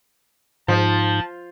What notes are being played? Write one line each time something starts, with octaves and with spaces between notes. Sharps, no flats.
G#2 F3 A5